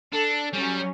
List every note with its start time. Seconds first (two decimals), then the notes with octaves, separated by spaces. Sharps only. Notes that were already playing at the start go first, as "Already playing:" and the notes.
0.13 D4 A4
0.53 F#3 G3 C#4